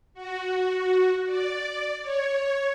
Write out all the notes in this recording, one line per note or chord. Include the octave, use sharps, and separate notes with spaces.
F#4
D5
C#5